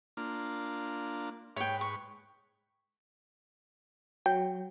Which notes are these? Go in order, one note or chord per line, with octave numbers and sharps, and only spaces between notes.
A#3 D4 F4
G#2 B4 C#5 G5
C#6
F#3 G5